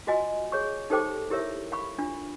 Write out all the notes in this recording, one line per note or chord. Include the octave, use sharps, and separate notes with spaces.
F4 F#4 D#5 G#5
G#4 C#5 C#6
D#4 G4 A4 C5 G5 D6
E4 G4 A#4 C#5 E5
F5 B5 C#6
D4 F4